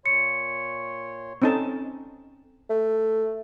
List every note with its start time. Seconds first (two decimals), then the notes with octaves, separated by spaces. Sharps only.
0.06 A#2 C#5 C6 C#7
1.42 C4 C#4 D#4 A4 A5
2.70 A3